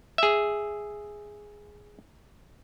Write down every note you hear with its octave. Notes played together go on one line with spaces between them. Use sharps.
G#4 E5